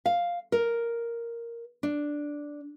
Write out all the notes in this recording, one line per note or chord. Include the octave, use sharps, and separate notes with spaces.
F5
A#4
D4